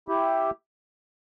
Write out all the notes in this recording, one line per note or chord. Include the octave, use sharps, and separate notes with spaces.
E4 G4